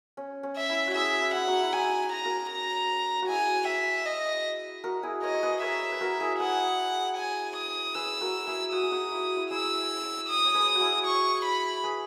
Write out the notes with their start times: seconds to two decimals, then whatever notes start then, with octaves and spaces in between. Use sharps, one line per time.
0.17 C#4
0.43 C#4
0.57 E5
0.69 E4
0.87 F#4
0.95 E4 G#4 E5
1.21 E4
1.34 E4 F#5
1.47 D#4 F#4
1.62 E4
1.72 D#4 F#4 G#5
2.12 A#5
2.25 F#4 A#4
2.50 A#5
3.22 F#4
3.28 E4 G#4 G#5
3.67 E5
4.06 D#5
4.84 F#4 A#4
5.03 E4 G#4
5.23 A#4 C#5 D#5
5.34 C#5
5.43 G#4 B4
5.62 A#4 C#5 E5
5.92 B4
6.01 F#4 A#4
6.20 E4 G#4
6.39 G#4 B4 F#5
7.17 G#5
7.56 D#6
7.95 G#4 B4 E6
8.21 F#4 A#4
8.47 E4 G#4
8.72 F#4 D#6
8.83 G#4
8.91 D#4 F#4
9.12 E4
9.25 F#4
9.37 E4
9.50 E4 G#4 E6
10.29 D#6
10.45 C#5
10.54 G#4 B4
10.75 F#4
10.80 E4 G#4
11.06 C#6
11.45 B5
11.83 G#4 B4